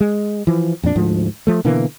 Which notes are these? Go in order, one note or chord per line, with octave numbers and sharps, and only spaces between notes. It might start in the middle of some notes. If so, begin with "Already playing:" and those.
G#3
E3 F3
F2 A#2 D4
D2 G#2 F3
F3 A3
B2 D3 E3 A#3